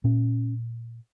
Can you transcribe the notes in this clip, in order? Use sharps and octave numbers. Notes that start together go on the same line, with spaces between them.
A#2 C#4